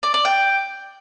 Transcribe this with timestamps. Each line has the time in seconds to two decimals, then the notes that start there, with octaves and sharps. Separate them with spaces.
0.03 D5
0.14 D5
0.25 G5